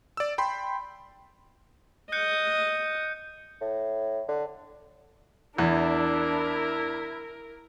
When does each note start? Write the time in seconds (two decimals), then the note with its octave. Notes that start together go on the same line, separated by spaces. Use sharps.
0.17 D5 E6
0.38 G5 B5 C6
2.12 D#5 F#6 G6 C#7
3.61 A2
4.28 D3
5.58 E2 D4 E4 A#4